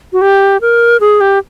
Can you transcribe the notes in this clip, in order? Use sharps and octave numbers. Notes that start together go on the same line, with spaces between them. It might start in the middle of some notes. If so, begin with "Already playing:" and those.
F#4
G4
A#4
G#4
G4